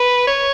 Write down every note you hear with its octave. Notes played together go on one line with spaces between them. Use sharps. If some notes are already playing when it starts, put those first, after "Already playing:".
Already playing: B4
C#5